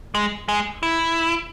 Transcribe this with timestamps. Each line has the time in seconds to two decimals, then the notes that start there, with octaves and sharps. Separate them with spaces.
0.15 G#3
0.48 G#3
0.83 E4